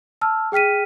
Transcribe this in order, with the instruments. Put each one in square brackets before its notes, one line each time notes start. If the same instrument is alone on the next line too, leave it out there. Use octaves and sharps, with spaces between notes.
[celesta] A5 E6 F6
G#4 G5 F6 B6 D#7